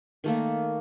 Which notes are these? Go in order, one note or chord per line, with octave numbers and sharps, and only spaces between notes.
D#3 A3 A#3